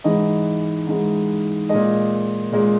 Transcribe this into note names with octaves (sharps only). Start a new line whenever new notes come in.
G#2 E3 G#3 D#5
G#2 E3 G#3
A#2 G#3 D#5
A#2 G#3